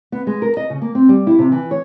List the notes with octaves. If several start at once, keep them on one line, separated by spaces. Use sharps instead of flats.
B3
G#3
A#4
D#5
C#3
A#3
C4
G3
E4
C3
E3
C#5